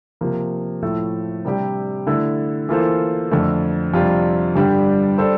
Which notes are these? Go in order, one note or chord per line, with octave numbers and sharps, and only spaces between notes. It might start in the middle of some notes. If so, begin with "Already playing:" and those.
C3 F3 A#3
A2 F3 A3
C3 G3 D4 G4
D3 A3 E4 A4
E3 A#3 F4 A4 C5
F2 D3 A3
F2 C3 G3 D4 F4
G2 D3 G3 D4 G4
G3 D4 A4 C5